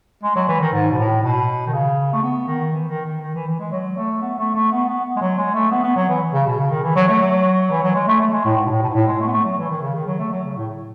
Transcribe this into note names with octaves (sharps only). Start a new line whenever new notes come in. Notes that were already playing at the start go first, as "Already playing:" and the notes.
G#3
F#3
E3
D#3
G#2
B2
A2
B2
D#3
C#3
A3
B3
D#3
E3
D#3
D#3
D#3
E3
E3
G#3
F#3
A3
B3
A3
A3
B3
B3
G#3
F#3
G#3
A3
B3
B3
F#3
E3
C#3
B2
C#3
D#3
E3
F#3
A3
F#3
E3
F#3
G#3
A3
A3
G#3
A2
G#2
B2
A2
B2
G#2
A2
G#3
A3
B3
A3
F#3
E3
D#3
C#3
D#3
F#3
A3
F#3
C#3
A2